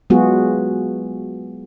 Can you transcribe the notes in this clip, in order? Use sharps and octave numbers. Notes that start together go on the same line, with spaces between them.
F#3 G#3 B3 F4 F#4 G#4